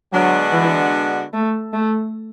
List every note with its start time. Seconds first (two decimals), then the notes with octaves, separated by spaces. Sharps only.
0.13 D3 F#3 G#3 B3 D4 F#4
0.53 E3
1.33 A3
1.73 A3